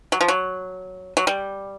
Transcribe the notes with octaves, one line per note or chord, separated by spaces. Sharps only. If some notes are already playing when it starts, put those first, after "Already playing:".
F#3
F3
F#3
F#3
G3